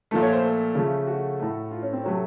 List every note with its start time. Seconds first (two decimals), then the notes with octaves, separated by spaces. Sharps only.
0.11 A#2 F3 A3 A4
0.22 C#5
0.33 C5
0.44 A4
0.75 C#3 F3 A3
1.07 F#4
1.40 A2 A3
1.71 F4
1.83 C#4
1.93 C4
2.03 C3 F#3 A3 C#4